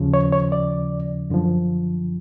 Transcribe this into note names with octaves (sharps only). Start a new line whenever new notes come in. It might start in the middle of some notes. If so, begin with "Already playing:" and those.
Already playing: D#2 C#3 F3
C#5
C#5
D5
F#2 D3 F3